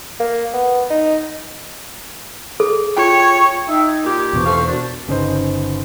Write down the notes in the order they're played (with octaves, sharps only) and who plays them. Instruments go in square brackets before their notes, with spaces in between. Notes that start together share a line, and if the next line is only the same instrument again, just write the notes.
[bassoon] A#3
B3
D#4
[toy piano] G#4 A4
[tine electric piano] F4 G5 [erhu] C#5
[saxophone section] D#4 [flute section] E5 G5 E6
[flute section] G#6
[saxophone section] A#2 G4
[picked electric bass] E2 B2 B3 [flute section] C5 C#6
[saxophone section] A3 C4 F5
[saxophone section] D4 [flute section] F#4 A#4
[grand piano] G1 C#3 D#4 C5